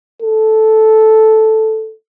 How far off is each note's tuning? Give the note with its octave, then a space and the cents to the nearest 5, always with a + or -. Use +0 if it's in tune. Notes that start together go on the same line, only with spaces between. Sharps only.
A4 -5